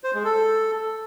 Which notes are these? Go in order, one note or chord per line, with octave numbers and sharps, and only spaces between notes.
C5
G#3
A4